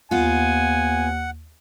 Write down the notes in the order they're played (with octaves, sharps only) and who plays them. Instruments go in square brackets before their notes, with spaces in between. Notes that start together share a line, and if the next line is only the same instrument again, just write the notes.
[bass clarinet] D#2 [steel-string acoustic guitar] B3 F4 [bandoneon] F#5 [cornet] G#5